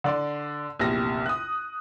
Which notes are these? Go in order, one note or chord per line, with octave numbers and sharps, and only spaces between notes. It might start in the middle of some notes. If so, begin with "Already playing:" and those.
D3 D5 C6
A#1 E2 C3 A#6
D#6 F#6